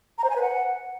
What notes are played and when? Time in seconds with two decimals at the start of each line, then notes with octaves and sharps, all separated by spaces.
0.18 A#5
0.24 C5
0.30 G#5
0.36 B4
0.42 F#5